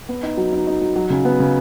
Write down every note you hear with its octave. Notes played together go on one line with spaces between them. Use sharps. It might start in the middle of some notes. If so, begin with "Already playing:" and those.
B3
D#4
F#3
D#4
D#4
F#3
F#3
C#3
B3
C#3